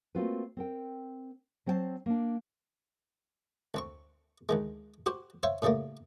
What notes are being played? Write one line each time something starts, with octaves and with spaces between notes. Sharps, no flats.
A3 A#3 C4 F4 F#4 B4
C4 A#4 G5
F#3 C4 C5 F#5 A5
A#3 D4
D2 C4 C#6
D2 D#3 G#3
F#4 G4 C5 F#5
C5 C#5 E5 F5 C#6
A2 C#3 G3 A3 A#3